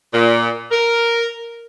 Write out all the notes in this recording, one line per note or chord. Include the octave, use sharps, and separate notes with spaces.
A#2
A#4